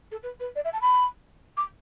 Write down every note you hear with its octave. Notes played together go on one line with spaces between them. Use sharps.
A4
B4
B4
D5
E5
A5
B5
D6